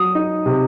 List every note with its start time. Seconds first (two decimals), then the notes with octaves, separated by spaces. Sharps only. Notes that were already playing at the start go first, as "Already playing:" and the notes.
Already playing: F#3 D#6
0.15 D#4
0.46 C3